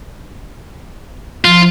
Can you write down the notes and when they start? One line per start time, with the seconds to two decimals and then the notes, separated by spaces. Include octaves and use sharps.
1.45 F3 F4